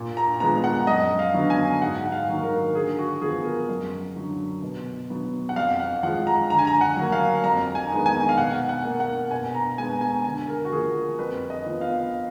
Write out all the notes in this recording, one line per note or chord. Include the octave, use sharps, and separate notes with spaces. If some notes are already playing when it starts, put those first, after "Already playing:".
Already playing: A#2
A#5
F3 G#3 B3 A#5
F#5
F#2 D#5
F5
D3 F#3 B3
G#5
G#2 F#5
F#5
F5
D#3 F#3 A#3
A#4
D3 G#4
F#4
F3 B3 G#4
A#4
F#2
D3 F#3
B2
F#3 B3
F#5
F2 F5
F#5
F3 G#3 F#5
A#5
D3 A#5
G#5
A#5
F#5
F#3 A#3
F5
F2 A#5
G#5
D#3 G#3 B3
G#5
F5
B2 F#5
F#5
A#3
F#5
B2 G#5
A#5
G#3 B3 G#5
G#5
D3 G#5
A#4
F#4
F3 A#3 G#4
F2 B4
D#5
F3 B3
F5